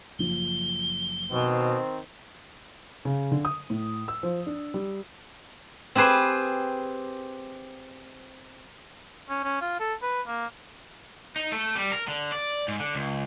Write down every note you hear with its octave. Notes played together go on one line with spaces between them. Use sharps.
F#1 F3 G7
B2 D#3 C4 C5
C#3
D3
D#6
A2
E6
F3
D4
G3
C4 G4 G#4 B4 C5
C#4
C#4
F4
A4
B4
A#3
D#4
A3
G3
A#4
D3
D5
G#2
D3
C#2